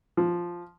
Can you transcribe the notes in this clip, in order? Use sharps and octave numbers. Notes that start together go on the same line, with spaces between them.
F3